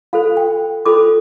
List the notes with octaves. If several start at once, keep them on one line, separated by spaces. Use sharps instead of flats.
F4 A4 C5 F5
G5
F4 A4 C5 D6